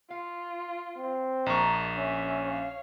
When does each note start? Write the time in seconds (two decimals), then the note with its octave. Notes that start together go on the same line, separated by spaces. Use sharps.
0.10 F4 F5
0.97 C4
1.46 A#1 A#4 D#5 A5 A#5 C#6
1.97 C#4 E5 G#5
2.46 C#5 F5